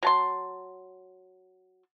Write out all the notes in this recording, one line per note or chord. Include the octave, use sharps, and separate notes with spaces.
F#3 A5 C6